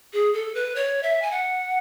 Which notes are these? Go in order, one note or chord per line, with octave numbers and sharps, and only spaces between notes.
G#4
A4
B4
C#5
E5
G#5
F#5